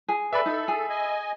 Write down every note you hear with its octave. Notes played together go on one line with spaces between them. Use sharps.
G#4
A4 B4 D5 E5 B5
D#4 A4
G#4
D#5 G#5